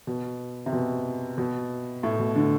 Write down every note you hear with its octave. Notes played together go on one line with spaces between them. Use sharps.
B2
C3
B2
B2
A2
B2
D3